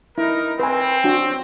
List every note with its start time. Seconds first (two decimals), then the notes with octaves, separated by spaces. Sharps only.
0.18 D#4 E4 A#4
0.60 C4 B4 G#5
1.04 D4 F#4